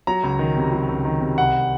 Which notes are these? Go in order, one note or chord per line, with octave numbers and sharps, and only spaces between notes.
F#3 A#5
C#2
D#3
C3
F#3
C#2
D#3
C3
C2 F#5